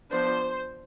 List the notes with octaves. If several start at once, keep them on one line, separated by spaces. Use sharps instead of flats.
F3 B3 D4 C5